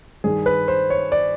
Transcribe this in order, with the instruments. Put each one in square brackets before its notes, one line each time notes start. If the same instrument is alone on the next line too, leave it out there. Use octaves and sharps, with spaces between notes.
[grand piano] G2 D#3 G#4
B4
C5
C#5
D5